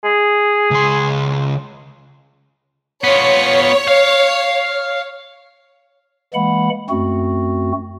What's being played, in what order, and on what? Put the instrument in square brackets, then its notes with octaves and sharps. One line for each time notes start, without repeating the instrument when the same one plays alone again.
[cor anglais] G#4
[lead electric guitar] C#2 C6
[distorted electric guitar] B3 F4 [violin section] C#5
[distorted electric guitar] F5
[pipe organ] E3 G#3 A#3 F#5 B5
F#2 A3 C4 F#4